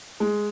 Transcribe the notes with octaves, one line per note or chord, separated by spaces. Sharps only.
G#3